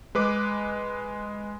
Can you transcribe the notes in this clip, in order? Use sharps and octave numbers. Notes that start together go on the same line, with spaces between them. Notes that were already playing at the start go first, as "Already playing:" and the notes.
G#3 B4 D6